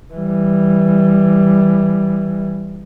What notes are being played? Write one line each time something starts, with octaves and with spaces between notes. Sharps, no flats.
E3 G3